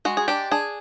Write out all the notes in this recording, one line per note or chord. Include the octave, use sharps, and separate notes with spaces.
G#3 F#4
G#4
D4 G4
D4 G#4